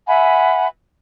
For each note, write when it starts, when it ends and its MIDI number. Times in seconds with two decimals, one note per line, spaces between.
0.07 0.67 76
0.07 0.67 78
0.07 0.67 80
0.07 0.67 83